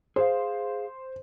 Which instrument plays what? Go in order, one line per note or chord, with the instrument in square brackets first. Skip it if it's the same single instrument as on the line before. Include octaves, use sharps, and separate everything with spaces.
[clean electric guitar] G#4 F5 [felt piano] C5